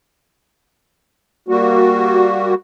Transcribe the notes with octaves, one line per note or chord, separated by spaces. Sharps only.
G3 A#3 F#4